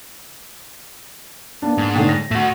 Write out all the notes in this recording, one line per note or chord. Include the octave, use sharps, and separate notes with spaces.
A#3 B3 D4
G#2
A2 D3 D#3 G5
A#6
A2 A3 F#4